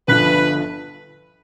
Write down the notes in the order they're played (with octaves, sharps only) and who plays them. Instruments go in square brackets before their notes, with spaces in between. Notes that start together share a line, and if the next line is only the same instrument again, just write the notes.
[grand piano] G1 G2 D3 F3 [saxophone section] B4